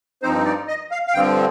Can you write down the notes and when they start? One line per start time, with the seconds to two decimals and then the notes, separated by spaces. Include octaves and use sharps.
0.22 G2 F3 C4 D#4 C5
0.45 D5
0.68 D#5
0.91 F5
1.07 F5
1.14 G2 D3 F3 C4 G5